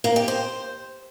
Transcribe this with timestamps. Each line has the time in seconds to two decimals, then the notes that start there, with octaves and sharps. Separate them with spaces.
0.04 A#3
0.16 G4
0.28 C5